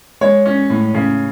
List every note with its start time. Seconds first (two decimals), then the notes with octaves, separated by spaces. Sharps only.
0.21 G#3 C#5
0.46 C#4
0.70 A2
0.94 C#3